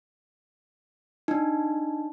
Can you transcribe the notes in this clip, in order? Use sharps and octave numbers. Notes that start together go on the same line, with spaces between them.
D4 D#4